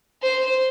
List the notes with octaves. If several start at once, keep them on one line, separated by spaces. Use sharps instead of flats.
C5